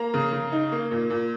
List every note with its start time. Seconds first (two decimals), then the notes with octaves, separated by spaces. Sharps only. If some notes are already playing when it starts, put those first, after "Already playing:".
Already playing: A#3 A#5
0.14 C#3
0.32 C#3
0.52 D#4
0.72 A#3
0.91 A#2
1.10 A#2